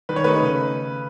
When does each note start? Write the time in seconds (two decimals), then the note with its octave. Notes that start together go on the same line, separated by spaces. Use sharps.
0.09 D#3 B4
0.16 C#5
0.24 A3 D#4 B4
0.40 C#3